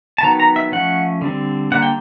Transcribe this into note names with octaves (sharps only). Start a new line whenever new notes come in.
A5
D#3 F#3 B3 A#5
A#5
E5
F3 A3 C#4 F#5
D3 G3 C4
D3 G3 A#3 F#5
G5